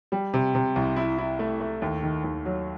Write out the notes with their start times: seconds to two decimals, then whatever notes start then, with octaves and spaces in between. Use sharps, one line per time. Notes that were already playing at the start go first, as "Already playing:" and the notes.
0.12 G3
0.34 C3
0.55 C3
0.76 C2
0.96 E4
1.18 E4
1.39 A3
1.60 A3
1.82 D#2
2.03 D#3
2.24 D#2
2.45 F#3